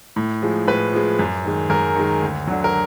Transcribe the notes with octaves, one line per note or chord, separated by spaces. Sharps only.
A2
F3 G#3
A2 B4
F3 G#3
F#2
D#3 G#3
F#2 A#4
D#3 G#3
D2
D3 F#3
A#4